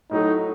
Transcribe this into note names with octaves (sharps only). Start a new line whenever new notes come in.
A2 F#3 A3 D#4